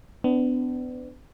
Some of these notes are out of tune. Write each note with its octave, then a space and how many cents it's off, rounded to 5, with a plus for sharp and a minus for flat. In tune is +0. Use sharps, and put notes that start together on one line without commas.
B3 +35 D4 +0